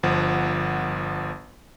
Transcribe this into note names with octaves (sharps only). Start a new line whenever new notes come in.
G1 F3 F#5